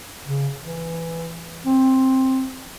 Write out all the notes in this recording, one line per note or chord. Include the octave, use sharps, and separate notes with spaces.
C#3
E3
C4